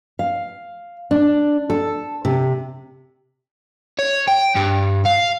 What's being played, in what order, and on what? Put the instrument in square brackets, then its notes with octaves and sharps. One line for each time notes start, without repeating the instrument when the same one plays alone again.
[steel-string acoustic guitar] F5
D4
A4
C3
[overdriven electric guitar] C#5
G5
G2
F5